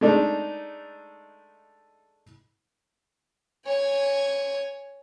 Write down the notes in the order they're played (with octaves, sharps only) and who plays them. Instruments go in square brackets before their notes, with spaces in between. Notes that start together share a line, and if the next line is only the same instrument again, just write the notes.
[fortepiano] G#3 A3 D4 D#4
[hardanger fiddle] C#5 G#5